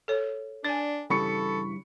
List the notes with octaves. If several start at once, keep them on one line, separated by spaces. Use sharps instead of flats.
A4 C#5
D4 D5 G#5
G2 C#3 E3 A4 B5 C#6 C#7